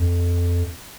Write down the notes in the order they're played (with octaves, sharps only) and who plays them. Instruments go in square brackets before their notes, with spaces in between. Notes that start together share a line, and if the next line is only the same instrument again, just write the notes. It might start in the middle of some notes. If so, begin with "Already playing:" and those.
Already playing: [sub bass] F2